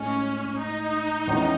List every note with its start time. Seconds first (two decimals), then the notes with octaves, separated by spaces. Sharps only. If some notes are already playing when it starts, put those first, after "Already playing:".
Already playing: A2 G#3 C#4 D#4
0.60 D#4
1.27 E2 D#3 G#3 C#4 E4